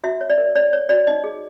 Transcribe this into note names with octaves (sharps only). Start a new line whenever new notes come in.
F#4 E5
C#5
D5
A#4
C#5 D5
C#5
F#4 D5
D#4 D#5
G#4